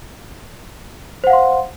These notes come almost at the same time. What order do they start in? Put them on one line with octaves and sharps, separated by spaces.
C5 F#5 F5 C6